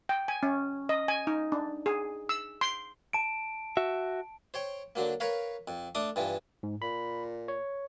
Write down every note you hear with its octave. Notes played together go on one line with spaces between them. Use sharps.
G5
G#5
C#4
D#5
G#5
D#4
D4
G#4
E6
C6
A5 D7
F#4 E5
C5 C#5 G5
D3 F#3 A#3
A#4 B4 C#5 F5
F2
A3 D4 D6 D#6
G2 E3 F3
G#2
A#2 B5
C#5